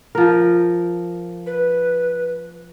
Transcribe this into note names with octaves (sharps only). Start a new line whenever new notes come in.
F3 A#4
B4